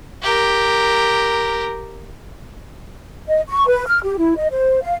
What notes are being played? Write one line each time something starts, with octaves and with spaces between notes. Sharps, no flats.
G4 A#4
D#5
C#6
B4
F6
G4
E4
D#5
C5
F5